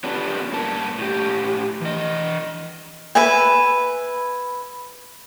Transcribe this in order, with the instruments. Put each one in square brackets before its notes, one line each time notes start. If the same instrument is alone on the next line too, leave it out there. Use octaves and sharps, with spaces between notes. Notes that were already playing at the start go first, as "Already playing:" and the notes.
[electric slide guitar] B3 C#4 D4 F4 G4 B4
G2 A#3 A#4 A5
A2 G4
E3 D#5
[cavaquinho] B4 E5 G#5